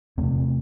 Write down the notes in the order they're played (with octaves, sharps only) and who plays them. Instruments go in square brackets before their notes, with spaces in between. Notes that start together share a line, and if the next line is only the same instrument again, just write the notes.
[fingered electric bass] E2 C3 A3 C4